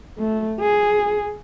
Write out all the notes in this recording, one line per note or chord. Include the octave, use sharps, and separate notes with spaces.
A3
G#4